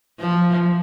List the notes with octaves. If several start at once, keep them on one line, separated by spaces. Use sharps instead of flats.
F3